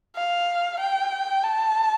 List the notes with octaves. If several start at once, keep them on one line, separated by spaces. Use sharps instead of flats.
F5
G5
A5